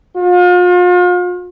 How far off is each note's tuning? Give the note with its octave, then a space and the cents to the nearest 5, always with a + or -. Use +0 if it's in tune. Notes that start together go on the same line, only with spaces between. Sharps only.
F4 +40